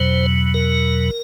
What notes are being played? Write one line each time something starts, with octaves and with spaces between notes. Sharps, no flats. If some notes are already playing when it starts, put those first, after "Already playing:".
Already playing: E2 B2 F#3 C5
A#4